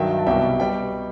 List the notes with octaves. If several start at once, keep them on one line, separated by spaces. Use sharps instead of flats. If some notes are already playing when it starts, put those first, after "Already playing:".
Already playing: G2 D#3 F#3 E5 G5
A5
C2 B2 G3 E5 G5
B2 G3 G5